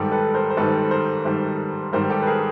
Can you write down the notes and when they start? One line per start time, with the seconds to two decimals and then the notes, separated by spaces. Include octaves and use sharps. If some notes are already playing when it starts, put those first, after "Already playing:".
Already playing: G#2 D#3 G3 G4 A4
0.12 A4 B4
0.34 A#4 C5
0.50 C5
0.57 G#2 D#3 G3 A4 B4
0.91 A#4 C5
1.25 G#2 D#3 G3
1.93 G#2 D#3 G3 A#4 C5
2.09 G4 A4
2.22 B4
2.27 G#4 A#4